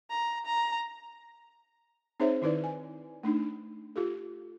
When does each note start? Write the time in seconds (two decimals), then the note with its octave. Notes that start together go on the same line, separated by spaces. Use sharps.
0.10 A#5
0.46 A#5
2.20 C4 D#4 G#4 C5 C#5 E5
2.42 D#3 D#4 E4 B4 D5
2.64 G#5
3.23 A3 D4 D#4
3.96 F4 G4 A4